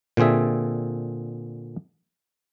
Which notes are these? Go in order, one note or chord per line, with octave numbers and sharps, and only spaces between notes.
A#2 D3 C4 G#4 E5